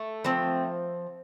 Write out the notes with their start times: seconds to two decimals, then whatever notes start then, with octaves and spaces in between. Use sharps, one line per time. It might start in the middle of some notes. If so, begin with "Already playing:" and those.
Already playing: A3
0.24 F3 C4